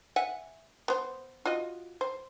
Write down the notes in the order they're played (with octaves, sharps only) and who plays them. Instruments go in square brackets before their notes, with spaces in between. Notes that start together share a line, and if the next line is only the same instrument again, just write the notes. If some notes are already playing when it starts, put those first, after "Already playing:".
[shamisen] E5 F#5 G#5
B3 C5
F4 F#4 D#5
C5